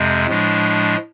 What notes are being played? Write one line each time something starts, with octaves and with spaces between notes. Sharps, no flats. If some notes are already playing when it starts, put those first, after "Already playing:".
Already playing: F2 C3 G#3
A2 F3 G#3 D4